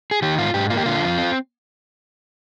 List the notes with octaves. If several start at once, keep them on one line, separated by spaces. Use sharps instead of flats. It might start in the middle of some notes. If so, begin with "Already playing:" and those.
G#4
D#3 G4
G#2 F4
G#2 G4
A#3 F4
G4
D3 F4
F2
C4